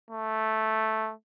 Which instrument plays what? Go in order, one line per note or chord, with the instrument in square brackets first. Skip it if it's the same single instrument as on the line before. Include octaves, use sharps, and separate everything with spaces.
[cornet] A3